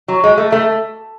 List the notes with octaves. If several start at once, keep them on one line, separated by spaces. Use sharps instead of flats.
F#3
G#3
A3
A3